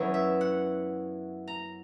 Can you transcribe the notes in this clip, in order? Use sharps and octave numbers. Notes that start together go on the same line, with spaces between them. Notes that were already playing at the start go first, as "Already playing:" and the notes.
Already playing: F#2 E3 B3 C#5
E5
F#5
A#5